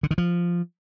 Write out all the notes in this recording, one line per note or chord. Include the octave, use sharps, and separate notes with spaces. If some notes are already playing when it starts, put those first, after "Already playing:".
D3
D#3
F3